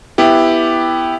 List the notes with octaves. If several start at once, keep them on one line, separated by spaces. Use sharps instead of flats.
B3 E4 G4